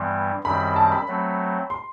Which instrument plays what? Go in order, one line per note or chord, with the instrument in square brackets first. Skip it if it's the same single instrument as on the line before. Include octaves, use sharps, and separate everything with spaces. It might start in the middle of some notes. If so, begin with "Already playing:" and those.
Already playing: [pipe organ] G2 E3 G3 B3 [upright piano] C6
[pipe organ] F#2 D#3 G3 C4 [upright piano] B5
[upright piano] A5
B5
[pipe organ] F#3 A3 C4
[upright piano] C6